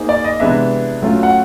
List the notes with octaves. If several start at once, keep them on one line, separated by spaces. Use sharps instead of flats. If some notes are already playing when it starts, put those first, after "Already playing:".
Already playing: A#3 D#4 G#4 C5
D5
D#5
C3 E3 G#3 B3 D4 E5
F#3 A3 C#4 F4
F#5